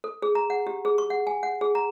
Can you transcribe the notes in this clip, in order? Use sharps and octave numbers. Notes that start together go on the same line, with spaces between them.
A4
G#4
A#5
F#5
G4
G#4
C#6
F#5
G#5
F#5
G#4
A#5